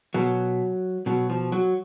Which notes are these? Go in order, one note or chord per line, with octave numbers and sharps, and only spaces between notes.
B2 F#3
B2 F#3
F3
F#3